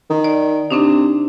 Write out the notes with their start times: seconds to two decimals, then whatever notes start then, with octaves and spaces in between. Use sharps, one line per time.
0.10 D#3
0.24 D5
0.71 C3 C4 D4 D#4